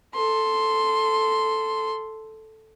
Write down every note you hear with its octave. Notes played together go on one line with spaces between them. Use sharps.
A4 C6